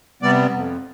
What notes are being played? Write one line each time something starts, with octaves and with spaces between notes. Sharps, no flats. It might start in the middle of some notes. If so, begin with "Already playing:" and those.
C3 G3 B3 D5
F2